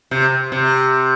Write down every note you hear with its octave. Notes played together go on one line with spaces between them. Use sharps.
C3
C3